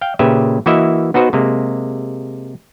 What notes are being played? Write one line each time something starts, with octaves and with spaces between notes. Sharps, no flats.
F5 G5
A#2 C#3 G4 B4 E5
E3 A#3 E4 F#4 D#5 E5
B3 D#4 F#4 B4 C5
C3 G#3 A#3